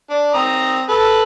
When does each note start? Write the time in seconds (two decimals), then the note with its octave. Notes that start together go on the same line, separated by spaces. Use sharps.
0.10 D4
0.34 C4 A#5 D#6
0.89 A4 B4